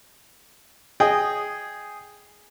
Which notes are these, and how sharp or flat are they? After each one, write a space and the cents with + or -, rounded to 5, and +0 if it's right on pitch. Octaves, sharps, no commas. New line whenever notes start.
G#4 +0 D#5 -10 G5 +0